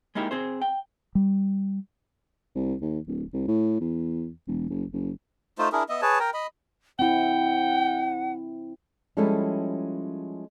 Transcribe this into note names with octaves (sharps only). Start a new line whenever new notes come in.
G#3 A#3 D#4 E4 G4
C4 G#4 C5
G5
G3
C2
D#2
D1
C2
A2
E2
E1
F#1
F#1
A3 D#4 F4 C5
D4 E4 G#4 A#4
B3 D#5 E5
G#4 B4 C#5 A5
A#4 G5 A#5
D#5 B5
C4 E4 F#5 G5
F3 G3 G#3 C#4 E4 A4